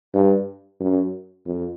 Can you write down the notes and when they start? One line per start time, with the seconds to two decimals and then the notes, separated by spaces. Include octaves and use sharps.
0.14 G2
0.80 F#2
1.46 F2